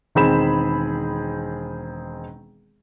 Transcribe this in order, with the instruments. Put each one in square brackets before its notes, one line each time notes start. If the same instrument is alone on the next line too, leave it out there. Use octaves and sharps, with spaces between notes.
[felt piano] E1 D#3 C4 G#4 B5 E7